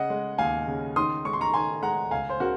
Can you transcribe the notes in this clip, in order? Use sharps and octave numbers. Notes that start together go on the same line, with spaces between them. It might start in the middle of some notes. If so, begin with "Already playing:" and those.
Already playing: C#3 D#5 F#5
G#3
D#2 F5 G#5
C#3
D#3 C6 D#6
G#3 C#6
C6
A#5 C#6
D#3 G#5 C6
G#3 F#5 A#5
C#2 F5 G#5
C5
C#3 F#4 A#4